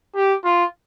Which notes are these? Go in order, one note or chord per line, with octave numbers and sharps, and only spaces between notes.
G4
F4